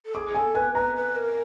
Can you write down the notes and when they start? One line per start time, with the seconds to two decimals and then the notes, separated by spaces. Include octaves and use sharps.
0.05 A4
0.15 G#4 D6
0.35 A4 G#5
0.55 B4 G#5
0.75 B4 A#5
0.96 B4
1.15 A#4